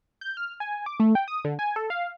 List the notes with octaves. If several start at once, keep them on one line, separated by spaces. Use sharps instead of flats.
G6
F6
G#5
D6
A3
G5
D#6
D3
G#5
A4
F5